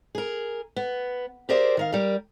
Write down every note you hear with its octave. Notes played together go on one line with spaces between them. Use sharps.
G#4 A#4
B3
G4 G#4 A#4 C5 D5 E5
D#3 A#4 F5
G3 A#4